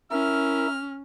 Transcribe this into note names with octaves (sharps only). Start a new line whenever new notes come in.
C#4 E4 A#4 E5 F6